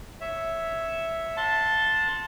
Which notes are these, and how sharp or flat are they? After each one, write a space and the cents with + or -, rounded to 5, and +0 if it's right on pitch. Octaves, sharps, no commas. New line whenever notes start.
C#5 +0 E5 +0
F#5 -45 A5 +0 C6 +0